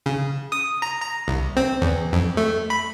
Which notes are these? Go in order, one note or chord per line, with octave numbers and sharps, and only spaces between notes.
C#3
D#6
A#5
A#5
C2
C4
E2
F2
A3
B5